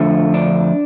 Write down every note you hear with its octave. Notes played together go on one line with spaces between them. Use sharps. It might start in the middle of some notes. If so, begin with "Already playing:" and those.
Already playing: F2 D3 F3 A3
D4